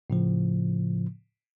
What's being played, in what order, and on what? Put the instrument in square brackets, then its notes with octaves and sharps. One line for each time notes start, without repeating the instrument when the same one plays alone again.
[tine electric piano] A2 C#3 F3